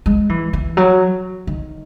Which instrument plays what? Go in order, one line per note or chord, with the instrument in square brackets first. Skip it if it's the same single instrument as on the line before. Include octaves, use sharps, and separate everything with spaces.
[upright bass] G#3
E3
E3
F#3
D#3